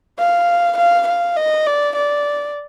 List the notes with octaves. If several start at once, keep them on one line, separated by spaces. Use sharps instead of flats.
F5
F5
F5
D#5
D5
D5